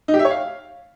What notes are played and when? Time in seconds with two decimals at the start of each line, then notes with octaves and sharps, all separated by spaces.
0.08 D#4
0.14 G4
0.19 E5
0.25 C#5
0.30 F5